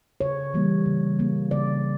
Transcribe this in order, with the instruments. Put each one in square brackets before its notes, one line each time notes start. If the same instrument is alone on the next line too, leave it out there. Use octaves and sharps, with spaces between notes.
[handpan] C#3 C#5
E3 G3 A#3
C#3
E3 G3 A#3
C#3 D5